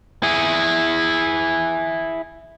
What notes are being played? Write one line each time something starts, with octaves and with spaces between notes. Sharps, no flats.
E4 G#4